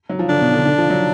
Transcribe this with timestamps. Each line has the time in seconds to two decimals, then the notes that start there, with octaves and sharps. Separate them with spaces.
0.09 F#3
0.19 F3
0.29 D3 D4
0.41 B2
0.53 D3
0.65 D3
0.78 F3
0.90 F#3